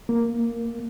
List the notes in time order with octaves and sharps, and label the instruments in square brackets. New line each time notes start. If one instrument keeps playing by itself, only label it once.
[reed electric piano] A#3